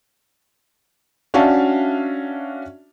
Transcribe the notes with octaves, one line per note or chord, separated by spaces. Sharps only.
C#4 D4 F#4 E5 F5 A5